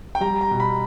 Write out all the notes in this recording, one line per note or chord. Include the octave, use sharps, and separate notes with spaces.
G5
G3 A#5
A#5
B2
B5